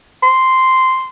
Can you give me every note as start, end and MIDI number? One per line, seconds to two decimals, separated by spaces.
0.23 1.09 84